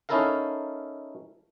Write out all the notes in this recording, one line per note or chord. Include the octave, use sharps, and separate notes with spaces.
C#4 D#4 E4 A4 A#4 F5